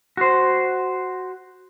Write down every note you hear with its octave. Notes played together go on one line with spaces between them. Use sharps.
F#4 C5